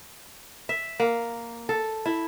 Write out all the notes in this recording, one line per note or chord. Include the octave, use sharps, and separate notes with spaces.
E5
A#3
A4
E4